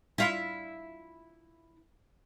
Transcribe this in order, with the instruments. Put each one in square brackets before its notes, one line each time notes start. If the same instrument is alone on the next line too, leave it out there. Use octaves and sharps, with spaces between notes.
[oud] E4 F4